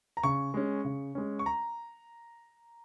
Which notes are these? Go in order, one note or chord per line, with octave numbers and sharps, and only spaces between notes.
A#5
C#3 C#6
G#3 C#4
C#3
G#3 C#4
C#6
A#5